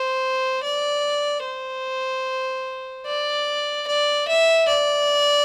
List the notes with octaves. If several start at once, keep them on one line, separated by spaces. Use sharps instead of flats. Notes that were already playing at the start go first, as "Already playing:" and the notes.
Already playing: C5
D5
C5
D5
D5
E5
D5